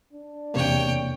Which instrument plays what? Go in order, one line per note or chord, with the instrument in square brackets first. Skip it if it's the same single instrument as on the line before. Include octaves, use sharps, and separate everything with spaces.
[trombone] D4
[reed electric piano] E2 C3 A#3 [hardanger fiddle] C#5 G5